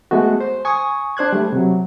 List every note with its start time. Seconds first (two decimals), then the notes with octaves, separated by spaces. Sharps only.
0.11 G#3 A3 B3 F#4
0.40 C5
0.65 G#5 C#6 D#6
1.17 D4 C5 F#6 G#6
1.33 G3 A3
1.53 C3 F#3